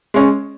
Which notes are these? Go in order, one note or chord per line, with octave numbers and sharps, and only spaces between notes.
G#3 C#4